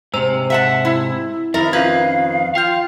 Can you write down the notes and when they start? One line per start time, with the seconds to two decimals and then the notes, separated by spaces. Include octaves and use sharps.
0.14 G#2 C3 C5 A#5 E6
0.50 E5 F#5 A5
0.85 E4
1.54 F2 D#3 E4 A#4 E5
1.73 C#4 F4 B4 F5 G#6
2.55 F4 F5 G5 F6 G6